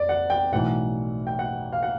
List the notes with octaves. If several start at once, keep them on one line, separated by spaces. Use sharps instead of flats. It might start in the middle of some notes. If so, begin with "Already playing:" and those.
Already playing: F2 D5
F#5
G5
B1 A2 E3 F#5
G5
F#5
F5
F#5